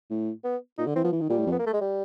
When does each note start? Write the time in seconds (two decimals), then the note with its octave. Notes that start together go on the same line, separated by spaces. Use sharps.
0.10 A2
0.44 B3
0.78 A#2 D#4
0.87 D3
0.95 E3 C4
1.04 F3 B3
1.13 E3
1.21 D#3
1.29 A#2 G3
1.38 A2
1.46 F2
1.52 B3
1.59 A#3
1.66 A3
1.73 G#3
1.81 G3